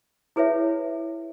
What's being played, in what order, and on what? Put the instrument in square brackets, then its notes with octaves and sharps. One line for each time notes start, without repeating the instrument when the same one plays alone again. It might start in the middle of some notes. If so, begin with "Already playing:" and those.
[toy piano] E4 G#4 B4 C#5 E5